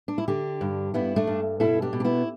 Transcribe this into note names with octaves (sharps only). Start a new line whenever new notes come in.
D4
E4
D3 D4 G4
G2
G2 B3 E4
A3 D4
G2
B2 E4 A4
D4 G4
B2
D4
B3 E4